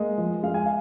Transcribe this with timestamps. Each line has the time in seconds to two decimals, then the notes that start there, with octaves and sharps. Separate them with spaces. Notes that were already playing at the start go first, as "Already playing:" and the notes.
Already playing: G#3 A#3 D#5
0.18 F3
0.43 G#3 F5
0.54 G#5
0.66 F5